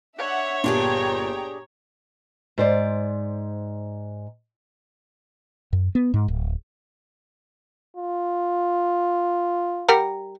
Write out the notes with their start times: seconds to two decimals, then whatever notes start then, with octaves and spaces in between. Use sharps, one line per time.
0.18 D4 C#5 E5 F#5
0.64 G1 A#2 D4 G4 G#4 G5 A#5
2.58 G#2 C5 D5
5.73 F#2
5.95 B3
6.14 G#2
6.28 D1
7.97 F4
9.88 G3 A#4 F#5